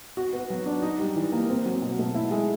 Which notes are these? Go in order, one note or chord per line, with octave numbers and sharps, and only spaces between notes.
F#4
B3
F#3
D4
D#4
G3
E3
A#3
C4
F#3
B2
A3
E4
G#3